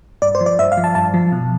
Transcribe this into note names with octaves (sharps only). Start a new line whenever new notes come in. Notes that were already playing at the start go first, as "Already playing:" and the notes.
G2 D5
C5
F3
D5
G2 E5
F5
F3
A5
G2 A5
F3
B2